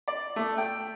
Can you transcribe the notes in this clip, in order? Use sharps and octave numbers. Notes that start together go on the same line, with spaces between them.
D5
A3
G5